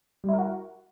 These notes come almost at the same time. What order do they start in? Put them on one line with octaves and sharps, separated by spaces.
G3 E4 A#4 F#4